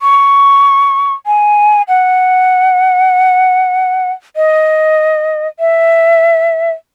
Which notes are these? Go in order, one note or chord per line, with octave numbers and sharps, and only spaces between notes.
C#6
G#5
F#5
D#5
E5